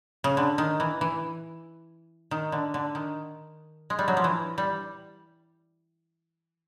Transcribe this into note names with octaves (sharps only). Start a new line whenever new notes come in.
C#3
D3
D#3
E3
E3
D#3
D3
D3
D#3
G#3
G3
F#3
F3
E3
G3